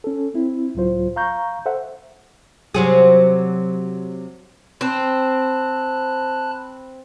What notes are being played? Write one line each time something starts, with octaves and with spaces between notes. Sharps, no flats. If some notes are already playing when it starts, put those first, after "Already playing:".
C#4 A4
C4 E4
C#2 A2 F#3 F4 C5
F5 A#5 C#6 G6
A4 C5 E5 F#5
C3 F#3 G#4
C4 A5 B5 F#6